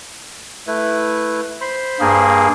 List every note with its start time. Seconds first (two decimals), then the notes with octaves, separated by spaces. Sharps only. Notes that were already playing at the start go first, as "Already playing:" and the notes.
0.67 A3 E4 B4
1.61 C5 B5 C6
2.00 G2 A#3 G#4